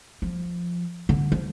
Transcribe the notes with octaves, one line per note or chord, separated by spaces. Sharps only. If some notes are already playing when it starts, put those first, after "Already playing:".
F3
D3
F3